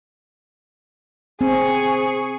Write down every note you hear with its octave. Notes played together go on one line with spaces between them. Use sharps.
C4 G#4 C#6